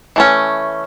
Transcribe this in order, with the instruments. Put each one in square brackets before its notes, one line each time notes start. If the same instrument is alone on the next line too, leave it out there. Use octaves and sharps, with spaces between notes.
[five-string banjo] E3 A3 C#4